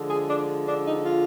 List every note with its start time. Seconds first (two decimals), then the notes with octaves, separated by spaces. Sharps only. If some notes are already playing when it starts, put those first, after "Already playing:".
Already playing: D3 F3 G#3
0.10 G#4
0.29 D4
0.68 D4
0.86 D#4
1.05 F4